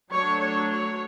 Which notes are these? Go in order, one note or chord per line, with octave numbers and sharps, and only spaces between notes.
F#3 A3 D4 C#5
C#5
C#5